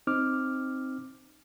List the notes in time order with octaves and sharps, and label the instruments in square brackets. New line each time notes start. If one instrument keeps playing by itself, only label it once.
[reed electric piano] C4 D#4 D6 F6